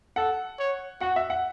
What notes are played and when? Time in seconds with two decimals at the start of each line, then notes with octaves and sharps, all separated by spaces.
0.16 A4 F#5
0.59 C#5
1.01 F#4 F#5
1.16 E5
1.30 F#5